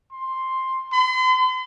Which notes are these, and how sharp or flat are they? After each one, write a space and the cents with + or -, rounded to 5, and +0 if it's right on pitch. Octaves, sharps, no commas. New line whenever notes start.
C6 +5
C6 -45